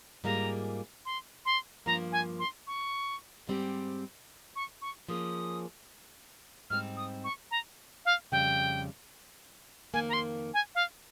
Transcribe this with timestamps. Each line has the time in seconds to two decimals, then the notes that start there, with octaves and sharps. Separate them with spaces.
0.24 G#2 G3 A#3 F4 G#4 A#5
1.05 C6
1.45 C6
1.86 G2 F3 A#3 A#5
2.12 G#5
2.39 C6
2.67 C#6
3.47 G#2 G3 C4 G4
4.56 C#6
4.82 C#6
5.09 F3 A#3 C#4 G#4 D#6
6.70 G#2 G3 C4 F6
6.97 D#6
7.24 C#6
7.51 A#5
8.05 F5
8.32 F2 C#3 G3 G5
9.93 F2 D#3 A#3 G#5
10.09 A#5
10.13 C6
10.54 G#5
10.75 F5